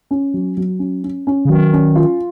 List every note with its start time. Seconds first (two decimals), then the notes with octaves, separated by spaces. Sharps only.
0.11 C#4
0.34 F#3
0.57 F#3
0.79 C#4
1.04 C#4
1.27 C#4
1.45 C#3
1.49 D#3 F#3
1.73 C#4
1.96 F4